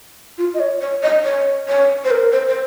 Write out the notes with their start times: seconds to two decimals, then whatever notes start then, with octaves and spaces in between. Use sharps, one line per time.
0.38 F4
0.54 D#5
0.60 C#5
0.81 C#5
1.03 D#5
1.24 C#5
1.68 C#5
2.05 C5
2.11 A#4
2.32 C5
2.48 C5